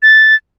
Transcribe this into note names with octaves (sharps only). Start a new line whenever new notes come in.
A6